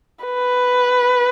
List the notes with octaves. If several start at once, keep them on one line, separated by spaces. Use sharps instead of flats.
B4